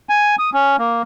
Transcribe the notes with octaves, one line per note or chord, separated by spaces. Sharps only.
G#5
D#6
C#4
A#3